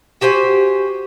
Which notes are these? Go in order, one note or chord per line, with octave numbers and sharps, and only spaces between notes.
F#4 G4 C5 G#5